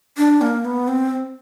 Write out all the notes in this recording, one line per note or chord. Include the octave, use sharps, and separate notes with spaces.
D4
A#3
B3
C4